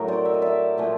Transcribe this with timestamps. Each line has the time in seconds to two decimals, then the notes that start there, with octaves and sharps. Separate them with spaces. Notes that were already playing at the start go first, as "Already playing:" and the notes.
Already playing: A2 F#3 A3 A#4
0.08 C5 D5
0.25 E5
0.34 D#5
0.42 D5 E5
0.78 A#2 F3 A3